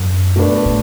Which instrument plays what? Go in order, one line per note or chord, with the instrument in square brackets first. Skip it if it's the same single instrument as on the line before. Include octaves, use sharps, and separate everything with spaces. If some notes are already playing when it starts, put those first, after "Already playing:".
Already playing: [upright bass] F#2
[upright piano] B2 A3 D4 B4
[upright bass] A2